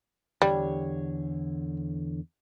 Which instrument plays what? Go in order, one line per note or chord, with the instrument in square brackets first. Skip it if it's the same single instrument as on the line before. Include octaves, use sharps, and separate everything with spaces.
[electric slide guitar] E2 D3 C#5 [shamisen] G3